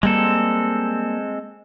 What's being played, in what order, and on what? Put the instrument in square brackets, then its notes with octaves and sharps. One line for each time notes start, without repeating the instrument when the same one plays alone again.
[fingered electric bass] G3 A#3 [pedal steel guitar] G#3 C4 A4